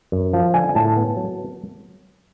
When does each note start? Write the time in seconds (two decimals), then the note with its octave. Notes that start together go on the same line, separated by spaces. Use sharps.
0.12 F#2
0.33 F3
0.54 D3 G#5
0.75 A2 A5
0.97 B3
1.16 F#3